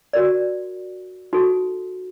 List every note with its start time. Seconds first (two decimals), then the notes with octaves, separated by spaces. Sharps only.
0.13 F#4 A#4 D5
1.33 D#4 F#4 A4